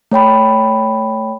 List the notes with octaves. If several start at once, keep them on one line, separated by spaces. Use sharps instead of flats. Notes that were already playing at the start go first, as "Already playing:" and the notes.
A3 C#5 G5 B5